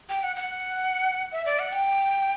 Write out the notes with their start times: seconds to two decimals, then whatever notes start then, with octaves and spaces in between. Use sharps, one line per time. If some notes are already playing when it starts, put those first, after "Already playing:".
0.09 G5
0.23 F#5
0.36 F#5
1.32 E5
1.46 D5
1.59 F#5
1.72 G5